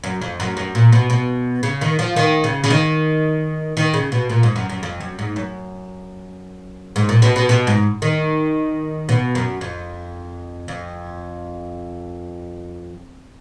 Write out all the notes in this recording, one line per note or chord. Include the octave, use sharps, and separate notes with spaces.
F#2
F2
F#2
F#2
A#2
B2
B2
C#3
D#3
F3
D#3
C#3
C#3
D#3
D#3
C#3
B2
A#2
G#2
F#2
F#2
F2
F#2
G#2
F#2
G#2
A#2
B2
B2
B2
G#2
D#3
B2
F#2
F2
F2